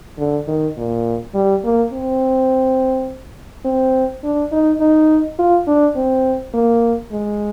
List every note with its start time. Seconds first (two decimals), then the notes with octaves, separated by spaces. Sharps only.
0.18 D3
0.47 D#3
0.77 A#2
1.34 G3
1.64 A#3
1.93 C4
3.65 C4
4.24 D4
4.52 D#4
4.80 D#4
5.39 F4
5.67 D4
5.96 C4
6.54 A#3
7.11 G#3